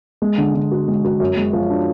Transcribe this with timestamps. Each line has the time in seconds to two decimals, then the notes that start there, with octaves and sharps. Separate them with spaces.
0.22 G#3
0.38 D3
0.55 D3
0.72 F#4
0.88 G#3
1.04 F#4
1.20 F#2
1.37 G#3
1.53 F3
1.70 D4